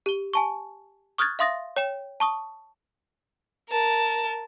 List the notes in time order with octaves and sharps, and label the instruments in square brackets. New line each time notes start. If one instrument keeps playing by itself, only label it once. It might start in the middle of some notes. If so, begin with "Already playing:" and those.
[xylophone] G4 G7
G#5 A5 C#6
C#6 D#6 F6 F#6 G#6 A6
E5 F5 C6 D#6 A6 A#6
C#5 G5 E7
A5 C#6 D#6
[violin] A#4 A5